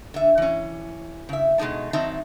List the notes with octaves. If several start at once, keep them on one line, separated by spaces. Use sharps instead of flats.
D3 E5
E3 C#4
C#3 E5
B2 G#3 A3 D#4 A5
D#3 F#3 C4 D#4 E5 A5